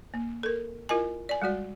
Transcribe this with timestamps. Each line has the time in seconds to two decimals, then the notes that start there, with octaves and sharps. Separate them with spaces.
0.14 A#3
0.43 A4 A#4
0.89 E4 F4 A#4 D#5 G#5
1.29 D5 G#5
1.42 G3 G#3 F#4 D5